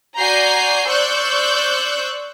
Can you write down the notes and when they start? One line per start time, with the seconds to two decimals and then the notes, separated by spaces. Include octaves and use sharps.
0.19 F#4 D5 G#5 A#5 G6 C7
0.88 C5 D5 C#6 E6 F#6 G6